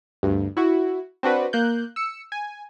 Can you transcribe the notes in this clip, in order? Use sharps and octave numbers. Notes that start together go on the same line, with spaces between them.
D2 G2
E4 F#4
C4 D4 F#4 B4
A#3 F#6 G6
E6 C#7
G#5